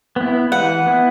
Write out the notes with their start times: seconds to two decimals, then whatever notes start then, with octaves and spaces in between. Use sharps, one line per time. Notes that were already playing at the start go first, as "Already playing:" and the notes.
0.16 B3 E4
0.52 E3 F#5
0.86 B3 E4